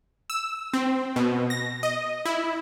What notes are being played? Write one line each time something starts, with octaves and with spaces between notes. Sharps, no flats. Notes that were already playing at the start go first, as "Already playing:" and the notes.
E6
C4
B2
A#6
D#5
E4